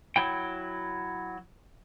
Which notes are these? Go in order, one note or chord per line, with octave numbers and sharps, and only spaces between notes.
F#3 E4 G5